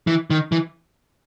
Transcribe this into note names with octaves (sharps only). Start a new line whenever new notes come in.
E3
D#3
E3